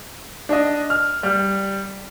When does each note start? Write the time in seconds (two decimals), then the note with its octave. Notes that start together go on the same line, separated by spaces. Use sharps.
0.49 D4 D#5
0.90 F6
1.23 G3